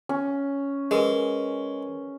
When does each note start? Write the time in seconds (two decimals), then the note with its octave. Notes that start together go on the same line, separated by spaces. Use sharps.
0.09 C#4
0.91 G#3 G#4 A#4 B4